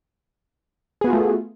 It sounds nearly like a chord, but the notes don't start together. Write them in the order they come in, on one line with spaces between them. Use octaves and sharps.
G#4 B3 F#4 F4 A3